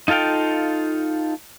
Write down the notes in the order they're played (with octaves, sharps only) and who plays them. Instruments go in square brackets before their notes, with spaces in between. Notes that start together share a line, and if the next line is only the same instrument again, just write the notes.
[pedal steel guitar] D#4 F4 A4 F5 G5